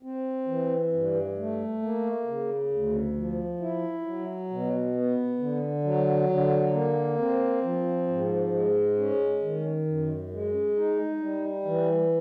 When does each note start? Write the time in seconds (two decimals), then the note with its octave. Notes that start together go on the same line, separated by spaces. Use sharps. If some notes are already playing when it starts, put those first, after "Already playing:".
0.03 C4
0.47 E3
0.92 G2
1.37 A3
1.82 A#3
2.26 C#3
2.71 D2
3.15 F3
3.60 E4
4.05 F#3
4.50 B2
4.95 B3
5.39 D3
5.84 F#3
6.29 D3
6.73 A#3
7.18 C4
7.63 F3
8.07 G#2
8.53 G#3
8.97 C#4
9.41 D#3
9.86 F#2
10.31 G#3
10.76 D#4
11.20 G3
11.65 E3